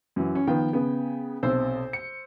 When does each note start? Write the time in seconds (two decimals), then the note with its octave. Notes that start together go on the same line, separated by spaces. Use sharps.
0.16 F#2 E3
0.35 C#4
0.47 D#3 F3 B3 G5
0.73 C#3 B3
1.43 B1 C3 C5 E6
1.93 C#7